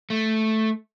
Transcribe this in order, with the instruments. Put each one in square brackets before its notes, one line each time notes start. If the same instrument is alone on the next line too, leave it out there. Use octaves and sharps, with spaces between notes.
[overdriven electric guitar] A3